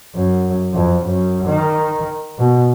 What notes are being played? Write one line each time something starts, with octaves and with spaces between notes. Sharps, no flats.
F#2
F2
F#2
D#3
B2